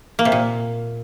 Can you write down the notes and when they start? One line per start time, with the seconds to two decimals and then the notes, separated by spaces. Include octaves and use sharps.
0.19 A#3
0.25 C3
0.32 A#2